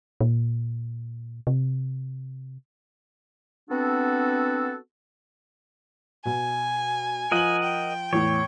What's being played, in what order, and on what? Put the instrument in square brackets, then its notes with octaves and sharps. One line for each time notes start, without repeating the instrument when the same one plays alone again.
[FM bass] A#2
C3
[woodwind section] B3 C4 D4 F#4 A4
[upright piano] B2 [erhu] G#5
[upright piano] F3 F#7 [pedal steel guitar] A#4 D#5 F#5
[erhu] G5
[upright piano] E2 A2 [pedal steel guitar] C#5